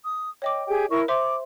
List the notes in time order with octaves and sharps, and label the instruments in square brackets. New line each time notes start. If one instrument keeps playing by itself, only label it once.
[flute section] D#6
[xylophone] C#5 D#5 D6 [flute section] G5
[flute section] G4 G#4 G5
E4 A#4 C#6
[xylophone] C5 E5 C6 [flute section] D6